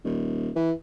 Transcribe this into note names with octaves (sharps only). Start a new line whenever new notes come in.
D#1
E3